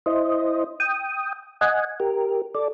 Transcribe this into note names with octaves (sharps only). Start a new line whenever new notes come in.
E4 C5 D#5
G5 D#6
D#5 F#5 G#5
G4 A#4
A4 D5